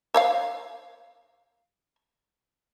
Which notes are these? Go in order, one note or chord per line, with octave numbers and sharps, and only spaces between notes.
C5 C#5 F5